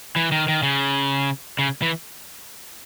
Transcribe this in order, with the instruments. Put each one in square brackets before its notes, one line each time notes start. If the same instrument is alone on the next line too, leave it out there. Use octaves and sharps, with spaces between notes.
[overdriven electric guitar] E3
D#3
D#3
C#3
C#3
E3